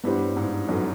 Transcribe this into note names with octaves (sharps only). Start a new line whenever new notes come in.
G2 B3 E4 G4 C5
G#2
F#2 B3 D#4 F#4 A4